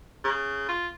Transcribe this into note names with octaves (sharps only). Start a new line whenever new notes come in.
C#3
F4